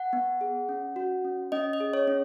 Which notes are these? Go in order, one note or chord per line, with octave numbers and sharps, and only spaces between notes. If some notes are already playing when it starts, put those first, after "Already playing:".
Already playing: F#5
B3
G#4
C#4
F#4
C#4
C#4 D#5
D#5
G#4
C#5
C#4